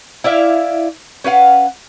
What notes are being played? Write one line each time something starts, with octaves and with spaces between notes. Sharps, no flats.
E4 D5 E5 F5
C#4 B4 F5 F#5